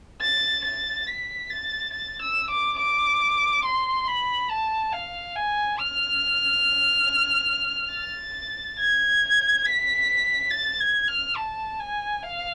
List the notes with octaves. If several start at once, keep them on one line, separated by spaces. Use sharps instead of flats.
A6
A6
B6
A6
A6
E6
D6
D6
C6
B5
A5
F5
G#5
F6
A6
G#6
B6
A6
G#6
F6
A5
G#5
F5